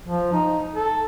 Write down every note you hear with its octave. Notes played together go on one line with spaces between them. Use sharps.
F3
D#4
A4